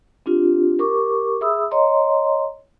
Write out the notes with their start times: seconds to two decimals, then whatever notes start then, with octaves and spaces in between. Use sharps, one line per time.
0.26 C4 D4 F4 G4
0.79 G4 A#4 C#6 D6
1.41 G#4 E5 B5 D#6 E6
1.71 C#5 D#5 A#5 C6